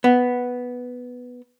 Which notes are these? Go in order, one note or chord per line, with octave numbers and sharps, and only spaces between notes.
B3